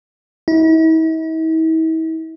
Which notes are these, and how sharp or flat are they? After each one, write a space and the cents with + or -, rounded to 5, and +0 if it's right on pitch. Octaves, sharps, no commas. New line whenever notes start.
E4 -45